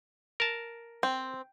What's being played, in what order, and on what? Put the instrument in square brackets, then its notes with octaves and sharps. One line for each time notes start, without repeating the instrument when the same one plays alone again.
[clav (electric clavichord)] A#4 A5
[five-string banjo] C4